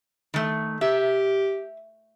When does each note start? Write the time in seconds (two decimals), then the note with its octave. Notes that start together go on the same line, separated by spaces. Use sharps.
0.34 D#3 A3
0.81 G4 E5